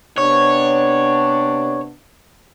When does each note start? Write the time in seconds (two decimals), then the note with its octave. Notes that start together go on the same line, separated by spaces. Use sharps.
0.18 C3 B3 D4 C#5